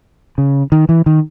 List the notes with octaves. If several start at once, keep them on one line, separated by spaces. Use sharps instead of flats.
C#3
D#3
E3
D#3